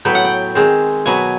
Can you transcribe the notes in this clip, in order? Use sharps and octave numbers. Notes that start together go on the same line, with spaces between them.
A2 F#3 B3 G5
F#5
G5
D#3 G#3 C4
B2 F#3 B3 G#5